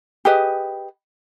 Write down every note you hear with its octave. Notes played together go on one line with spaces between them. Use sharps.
G4 G#4 B4 D#5